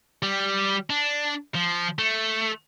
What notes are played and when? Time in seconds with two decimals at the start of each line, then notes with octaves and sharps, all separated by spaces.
0.23 G3
0.90 D4
1.55 F3
1.99 A3